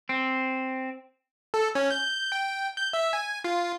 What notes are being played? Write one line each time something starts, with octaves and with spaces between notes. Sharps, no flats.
C4
A4
C#4
G6
G5
G6
E5
G#5
F4